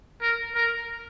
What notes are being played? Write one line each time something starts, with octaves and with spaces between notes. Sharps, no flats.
A#4
A#4